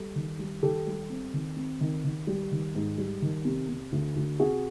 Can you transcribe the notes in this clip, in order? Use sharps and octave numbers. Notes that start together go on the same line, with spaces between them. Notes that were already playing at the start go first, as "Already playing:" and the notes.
Already playing: G3 A4
D#3
G3
D#3 G4 A4
G3
C4
D#3
C4
D#3
D#3
G3
D#3
G#2
G3
D#3
C3
C3
D2
D2
C3 F#4 G#4